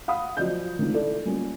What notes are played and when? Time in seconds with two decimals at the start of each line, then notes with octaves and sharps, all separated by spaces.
0.08 F5 F#5 B5 D#6
0.37 F3 F#3 D5 D#5 G6
0.79 D#3 G#3 C4 D4 D#4 F4
0.94 E4 A4 D5
1.25 F#3 G3 A#3 C#4 F4